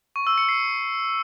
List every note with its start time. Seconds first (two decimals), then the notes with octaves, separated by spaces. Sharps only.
0.16 C#6
0.27 E6
0.38 C#7
0.49 C7